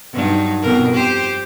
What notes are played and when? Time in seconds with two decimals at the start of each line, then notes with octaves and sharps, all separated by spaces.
0.13 G2 F#3 D#4
0.62 F2 B2 A#4
0.94 G4 C5